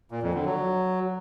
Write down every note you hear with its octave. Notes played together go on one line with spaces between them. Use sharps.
A#2
F2
D3
F#3